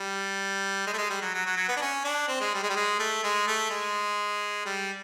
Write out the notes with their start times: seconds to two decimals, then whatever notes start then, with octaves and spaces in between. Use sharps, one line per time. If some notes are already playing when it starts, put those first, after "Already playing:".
Already playing: G3
0.87 G#3
0.93 A3
0.98 G#3
1.10 G3
1.22 F#3
1.34 F#3
1.46 F#3
1.57 F#3
1.69 B3
1.77 D4
1.81 C#4
2.04 D4
2.28 C4
2.40 G#3
2.54 G3
2.63 G#3
2.70 G3
2.76 G#3
2.99 A3
3.23 G#3
3.47 A3
3.70 G#3
4.66 G3